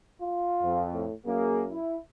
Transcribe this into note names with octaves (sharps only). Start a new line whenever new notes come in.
F4
F2
A2
F#2 A#3 G#4
E4